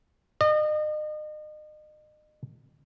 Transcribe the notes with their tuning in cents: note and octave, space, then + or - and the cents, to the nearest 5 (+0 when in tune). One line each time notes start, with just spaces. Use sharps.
D#5 -35